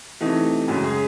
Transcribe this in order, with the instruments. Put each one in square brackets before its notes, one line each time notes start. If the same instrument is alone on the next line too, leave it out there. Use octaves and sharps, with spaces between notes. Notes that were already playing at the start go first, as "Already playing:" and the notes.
[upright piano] C3 E3 A3 D#4
F#2 C#3 G#3 F#4
G#4